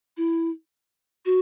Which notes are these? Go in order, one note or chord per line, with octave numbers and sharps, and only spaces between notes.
E4
F#4